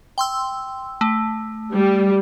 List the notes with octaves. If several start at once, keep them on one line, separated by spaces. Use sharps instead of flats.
G5 C6 E6
A3
G3